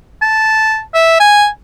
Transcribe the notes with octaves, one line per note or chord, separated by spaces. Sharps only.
A5
E5
G#5